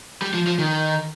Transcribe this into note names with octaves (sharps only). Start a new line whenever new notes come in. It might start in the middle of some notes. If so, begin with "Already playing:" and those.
G3
F3
F3
D#3